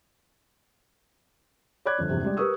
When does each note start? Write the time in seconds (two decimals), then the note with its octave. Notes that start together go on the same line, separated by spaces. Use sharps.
1.85 C#5 D5 B5 D6 F#6 G#6
1.98 G1 F2
2.09 A#1 E2 C3
2.24 G3 G#3 D5
2.37 G4 A#4 B4 C#6 D#6 E6